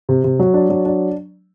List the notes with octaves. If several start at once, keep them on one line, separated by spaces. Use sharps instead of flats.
C3
C3
F#3
D4
F#3
D4